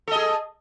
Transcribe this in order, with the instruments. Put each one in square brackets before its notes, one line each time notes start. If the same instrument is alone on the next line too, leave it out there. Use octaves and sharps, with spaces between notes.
[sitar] A4
D#5
G#4